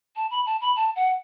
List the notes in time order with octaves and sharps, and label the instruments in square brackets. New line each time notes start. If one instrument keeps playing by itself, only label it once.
[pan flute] A5
B5
A5
B5
A5
F#5